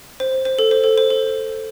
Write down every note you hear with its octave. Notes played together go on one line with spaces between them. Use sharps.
C5
C5
A4
C5
A4
C5
A4